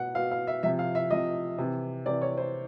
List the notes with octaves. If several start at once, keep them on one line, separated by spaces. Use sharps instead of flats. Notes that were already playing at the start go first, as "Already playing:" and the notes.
Already playing: B2 F#5
B2 F5
F5
E5
C3 F3 E5
F5
E5
C3 F3 D#5
C3 E3
C3 E3 D5
C#5
C5